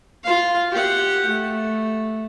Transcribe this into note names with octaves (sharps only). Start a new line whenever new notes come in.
F4 F5
G4 F#5
A3